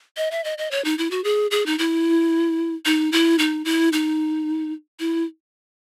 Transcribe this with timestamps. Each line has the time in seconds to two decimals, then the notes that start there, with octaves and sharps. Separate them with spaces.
0.17 D#5
0.31 E5
0.44 D#5
0.58 D#5
0.71 C#5
0.85 D#4
0.98 E4
1.11 F#4
1.24 G#4
1.51 G#4
1.66 D#4
1.79 E4
2.85 D#4
3.12 E4
3.39 D#4
3.65 E4
3.93 D#4
5.00 E4